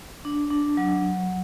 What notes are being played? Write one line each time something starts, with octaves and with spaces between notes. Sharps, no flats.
D4
D4
F#3